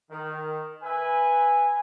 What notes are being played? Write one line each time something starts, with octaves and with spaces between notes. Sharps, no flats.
D#3
B4 E5 G#5